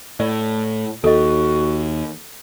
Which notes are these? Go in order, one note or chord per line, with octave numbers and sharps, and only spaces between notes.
A2 D5
D#2 F#4 A4 D#5